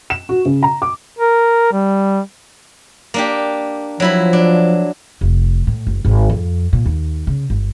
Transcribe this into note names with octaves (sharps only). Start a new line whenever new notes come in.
E7
F#4
C#3
A#5
D6
A#4
G3
A#3 D4 G4
F3 F#3 E4 B5
D4
F1
A2
F#1
G#1
F2
A#2
D#2
C#3
G1